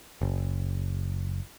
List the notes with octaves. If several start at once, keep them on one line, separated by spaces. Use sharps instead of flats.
F#1